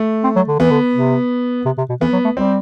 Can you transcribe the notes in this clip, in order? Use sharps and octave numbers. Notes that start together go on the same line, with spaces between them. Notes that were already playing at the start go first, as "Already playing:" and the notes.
Already playing: A3
C4
F#3
D3
E3 B3
D3
C3
C3
C3
B2
E3 B3
F#3
A3
G3 C4